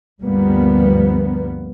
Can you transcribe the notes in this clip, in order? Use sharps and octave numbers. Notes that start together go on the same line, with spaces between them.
D2 G2 F3 G3 A#3 B3